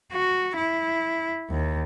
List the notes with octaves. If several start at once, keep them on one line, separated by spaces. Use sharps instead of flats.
F#4
E4
D#2